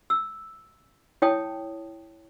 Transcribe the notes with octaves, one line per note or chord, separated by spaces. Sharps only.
E6
E4 C#5 G5 A5 D#6